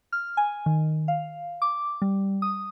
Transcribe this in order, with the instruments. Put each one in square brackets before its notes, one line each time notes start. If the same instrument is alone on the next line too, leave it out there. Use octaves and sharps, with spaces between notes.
[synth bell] F6
G#5
D#3
F5
D6
G3
D#6